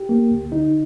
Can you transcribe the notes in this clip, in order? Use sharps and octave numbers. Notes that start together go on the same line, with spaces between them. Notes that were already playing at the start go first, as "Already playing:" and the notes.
Already playing: G4
A#3
D2
D3 D#4